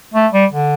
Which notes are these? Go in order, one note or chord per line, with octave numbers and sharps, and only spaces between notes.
A3
G3
D3